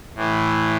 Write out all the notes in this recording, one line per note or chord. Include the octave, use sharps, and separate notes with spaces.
A2 E3